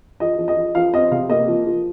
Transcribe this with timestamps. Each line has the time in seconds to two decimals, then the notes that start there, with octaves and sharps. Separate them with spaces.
0.20 F3 D#5
0.38 F3
0.48 D#5
0.57 F3
0.75 F3 F5
0.93 C4 D#5
1.11 C3 F5
1.29 A#3 D#5
1.48 F3
1.66 F3